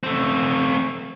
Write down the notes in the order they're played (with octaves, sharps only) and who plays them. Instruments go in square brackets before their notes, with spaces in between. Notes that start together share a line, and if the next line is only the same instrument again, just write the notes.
[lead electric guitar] A3 C4